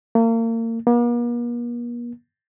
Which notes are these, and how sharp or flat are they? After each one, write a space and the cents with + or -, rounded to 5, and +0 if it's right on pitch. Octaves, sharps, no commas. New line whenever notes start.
A#3 -35
A#3 +45